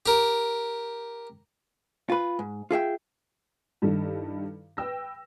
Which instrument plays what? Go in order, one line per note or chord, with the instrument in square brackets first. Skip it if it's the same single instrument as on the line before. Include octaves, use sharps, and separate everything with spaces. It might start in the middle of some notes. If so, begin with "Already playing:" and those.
[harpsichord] G4 A#4
[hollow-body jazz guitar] F4 B4
G#2
F4 G#4 E5 G5
[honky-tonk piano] G2 D#3 G3 E4 A4
B4 G5 E6 A#6